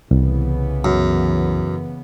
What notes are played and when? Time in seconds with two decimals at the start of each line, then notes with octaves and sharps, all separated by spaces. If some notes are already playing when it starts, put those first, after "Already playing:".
0.11 C2 C#3 E3 B3
0.85 F#2